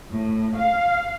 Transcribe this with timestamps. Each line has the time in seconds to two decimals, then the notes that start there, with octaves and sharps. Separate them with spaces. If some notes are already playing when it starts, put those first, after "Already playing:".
0.11 A2
0.57 F5